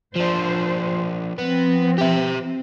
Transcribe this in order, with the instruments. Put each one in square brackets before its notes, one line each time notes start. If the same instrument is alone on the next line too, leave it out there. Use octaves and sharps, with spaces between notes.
[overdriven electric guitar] F3 D4 [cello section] C5
[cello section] F3 C4 [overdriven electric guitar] B3
[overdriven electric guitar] G4 E5